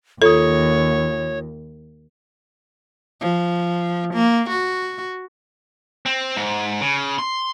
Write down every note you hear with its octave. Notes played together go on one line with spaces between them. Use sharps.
D#2 F4 A4 C#5 D#6
F3
A#3
F#4
C4
G#2
C#3
C6